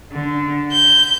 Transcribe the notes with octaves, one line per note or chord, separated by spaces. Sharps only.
D3
G6